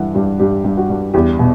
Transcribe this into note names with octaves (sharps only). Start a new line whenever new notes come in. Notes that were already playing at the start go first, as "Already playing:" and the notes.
Already playing: G2 E3 F#5
G2 G4
G2 G4
G2
F#4
G2
E2 G4
B2